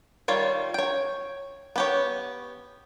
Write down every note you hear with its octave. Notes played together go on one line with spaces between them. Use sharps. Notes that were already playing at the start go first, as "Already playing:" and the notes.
D#3 G3 F4 C#5
C#5 G5
B3 G4 C#5